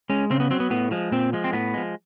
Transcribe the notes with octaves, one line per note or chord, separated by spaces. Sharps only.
G#3 C#4
C#3 C4
B3
F#3 C4
B3
A2 B3
F3 G#3
A#2 C4
F3 G#3
C4
A2 B3
F3 G#3